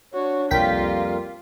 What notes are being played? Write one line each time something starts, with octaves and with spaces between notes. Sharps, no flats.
D4 F#4 C#5
C2 F2 G3 A#3 F4 A#4 G5 B6